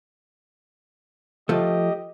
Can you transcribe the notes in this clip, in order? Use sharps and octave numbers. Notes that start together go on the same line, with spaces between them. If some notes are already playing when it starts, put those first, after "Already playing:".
F3 A3 G4 D#5